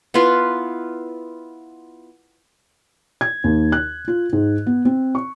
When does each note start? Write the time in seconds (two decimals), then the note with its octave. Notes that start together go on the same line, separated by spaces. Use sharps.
0.14 B3 E4 F4 B4
3.21 G#6
3.44 D#2
3.72 F#6
4.08 F4
4.33 G#2
4.66 B3
4.85 C4
5.15 C#6